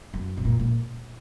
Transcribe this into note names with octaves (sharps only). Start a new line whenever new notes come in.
F#2
C3
A#2
A#2